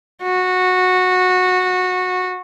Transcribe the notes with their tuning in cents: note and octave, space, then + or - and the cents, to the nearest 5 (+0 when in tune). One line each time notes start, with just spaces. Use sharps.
F#4 -15